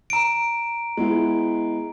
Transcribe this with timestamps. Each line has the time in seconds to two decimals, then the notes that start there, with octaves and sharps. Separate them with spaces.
0.10 A#5 D7
0.97 G#3 B3 E4